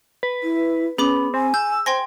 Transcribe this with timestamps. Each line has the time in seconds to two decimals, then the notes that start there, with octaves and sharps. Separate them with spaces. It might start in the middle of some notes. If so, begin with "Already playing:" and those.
0.23 B4
0.43 E4
0.98 B3 C#4 G#4 B5 D6
1.34 C4 G#5
1.54 E6 G6
1.86 C5 G5 G#5 C6 A#6